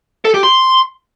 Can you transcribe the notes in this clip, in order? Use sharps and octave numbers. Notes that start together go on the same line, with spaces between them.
A4
G4
C6